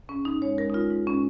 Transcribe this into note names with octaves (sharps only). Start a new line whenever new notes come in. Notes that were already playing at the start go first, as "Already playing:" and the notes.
G#2 C#4
G#2 D#4
G#3 C#5
G#3 A#4
D#4
G#3 F4
G#2
G#3 C#4